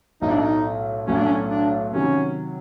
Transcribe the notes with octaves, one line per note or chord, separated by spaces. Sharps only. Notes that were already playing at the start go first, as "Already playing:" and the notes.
B1 A2 F#3 A3 D#4
D4
D#4
B1 A2 F#3 A3 C#4
D4
C#4
D4
C3 D#3 F#3 C#4